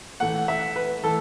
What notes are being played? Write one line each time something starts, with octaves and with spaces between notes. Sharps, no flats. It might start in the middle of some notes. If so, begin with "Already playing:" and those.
A2 E3 A3 F#5
E5
B4
E3 A3 A4